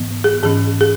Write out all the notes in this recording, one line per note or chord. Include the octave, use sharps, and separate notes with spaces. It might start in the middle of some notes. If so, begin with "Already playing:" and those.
Already playing: G#2 E3 B3
G#4
G#2 E3 C#4 G#4
G#4